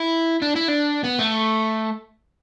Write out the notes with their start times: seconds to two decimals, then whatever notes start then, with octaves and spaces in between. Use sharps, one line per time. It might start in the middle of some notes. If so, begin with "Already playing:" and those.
Already playing: E4
0.42 D4
0.56 E4
0.69 D4
1.05 B3
1.19 A3